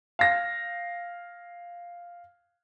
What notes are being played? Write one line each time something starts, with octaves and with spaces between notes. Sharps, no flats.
F5 A#6